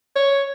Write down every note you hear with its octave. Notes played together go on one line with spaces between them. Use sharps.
C#5